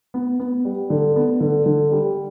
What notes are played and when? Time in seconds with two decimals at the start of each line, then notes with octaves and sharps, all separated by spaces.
0.14 B3
0.40 B3
0.65 G3
0.90 D3
1.16 B3
1.41 D3
1.66 D3
1.92 G3